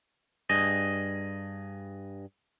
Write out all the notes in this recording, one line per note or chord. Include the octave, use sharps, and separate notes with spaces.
G2 G#4 D#5